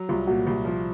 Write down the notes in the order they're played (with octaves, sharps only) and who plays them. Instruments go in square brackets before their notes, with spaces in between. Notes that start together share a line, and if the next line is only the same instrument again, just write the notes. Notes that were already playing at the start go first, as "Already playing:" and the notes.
Already playing: [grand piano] F#3
[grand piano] C2 [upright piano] F4
[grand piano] A#2 [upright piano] F#4
[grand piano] C2
F3